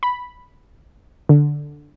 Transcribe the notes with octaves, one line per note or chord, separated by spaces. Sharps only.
B5
D3